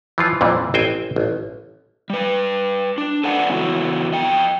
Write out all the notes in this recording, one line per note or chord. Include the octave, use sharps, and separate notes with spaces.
E3 F3 F4
F2 A#2 E3 G3
A1 C4 C5 G5 G#5
A1
G3 B4
D4
A4 B4 C5 D5 F#5 G#5
C#3 E3 B3 E4 F#4 A4
F2 D#5 G5